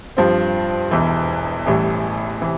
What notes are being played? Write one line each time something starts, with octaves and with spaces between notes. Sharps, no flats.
G2 F3 C4
E1 E2 E3
A1 A2 E3 G3
C3 E3